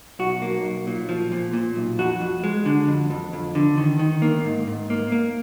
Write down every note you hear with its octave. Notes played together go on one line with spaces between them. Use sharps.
B1 F#4
A#3
B1
A#2
F3
A#2
A#2
B1
F2 F#4
F2
G#3
D3
F2
F2
F2
D3
D#3
D#3
A#3
G#2
G#2
A#3
A#3